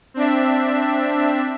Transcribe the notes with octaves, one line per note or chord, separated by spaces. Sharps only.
C4 D4 E5